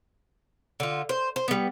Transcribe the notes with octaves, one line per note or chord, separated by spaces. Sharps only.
D3 F4
C5
C5
G3 B3